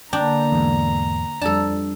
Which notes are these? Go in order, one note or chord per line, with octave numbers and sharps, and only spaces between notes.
D3 A#3 D4 G5 A#5
E2 G#2
F2 G3 D4 A4 A5